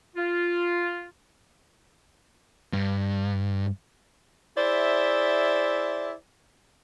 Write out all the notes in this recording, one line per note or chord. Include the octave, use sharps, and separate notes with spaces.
F4
G2
E4 G#4 C5 D5 E5